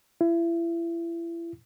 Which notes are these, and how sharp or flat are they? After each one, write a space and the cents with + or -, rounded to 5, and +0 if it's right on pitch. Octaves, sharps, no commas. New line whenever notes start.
E4 +35